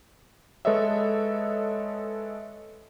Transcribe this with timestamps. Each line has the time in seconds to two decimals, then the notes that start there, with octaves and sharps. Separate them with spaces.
0.65 G#3 A4 B4 C#5 D#5 E5